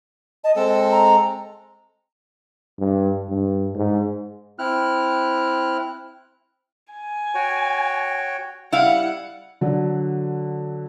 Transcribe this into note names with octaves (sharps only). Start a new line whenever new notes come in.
D#5 A5
G#3 C4 A4 A5
A#5
G2
G2
G#2
C4 E4 F6 F#6
G#5
F#4 C#5 G5
G3 E4 F5 F#5
D3 F#3